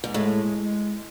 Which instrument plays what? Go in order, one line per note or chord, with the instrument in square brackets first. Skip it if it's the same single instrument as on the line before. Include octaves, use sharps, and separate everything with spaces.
[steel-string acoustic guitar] G#2
[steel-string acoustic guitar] A2 [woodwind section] G#3
[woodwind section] G#3